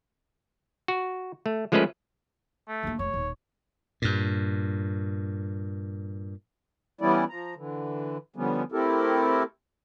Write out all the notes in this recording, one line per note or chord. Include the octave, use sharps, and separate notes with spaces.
F#4
A3
F3 G#3 A3 C#4 G#4 B4
A3
D3 A#3
F1 C#5
D#1
G2 A#2
E3 G3 B3 C#4 E4 D5
F3 A#5
D3 E3
D3 F3 G3 B3 C#4
A3 C4 E4 G4 A4 A#4